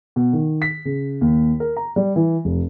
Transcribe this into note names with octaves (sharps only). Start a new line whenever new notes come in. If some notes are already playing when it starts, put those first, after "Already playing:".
B2
D#3
B6
C#3
D#2
A#4
A#5
G3
E3
F1